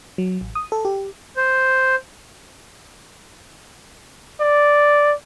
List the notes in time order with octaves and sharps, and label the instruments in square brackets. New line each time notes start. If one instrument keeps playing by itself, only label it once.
[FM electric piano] F#3
A1
D#6
A4
G4
[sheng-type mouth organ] C5
[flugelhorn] D5